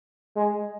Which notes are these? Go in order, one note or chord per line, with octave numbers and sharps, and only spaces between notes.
G#3